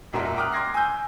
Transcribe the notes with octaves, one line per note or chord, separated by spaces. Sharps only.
E1 B1 F#2 A#2 A#4 E5
G5 A#5 D6 D#6 F6 F#6
C6 D6 G#6 A#6 C7
G#5 E6 G6